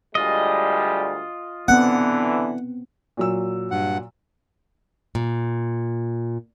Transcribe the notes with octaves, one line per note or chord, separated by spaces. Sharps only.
D2 G3 G#3 F4 D#5
D3 E3 B3 C4 F#5
A#2 F#3 E6
G2 F#5
A#2